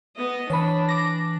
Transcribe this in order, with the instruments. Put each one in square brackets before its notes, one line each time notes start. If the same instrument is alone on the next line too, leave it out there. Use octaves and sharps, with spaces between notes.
[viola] B3 D#5
[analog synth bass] E3 [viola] D4 [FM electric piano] C#5 B5
[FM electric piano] D6 A#6